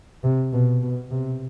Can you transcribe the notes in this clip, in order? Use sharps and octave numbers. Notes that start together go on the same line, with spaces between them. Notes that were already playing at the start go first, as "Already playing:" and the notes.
C3
B2
B2
C3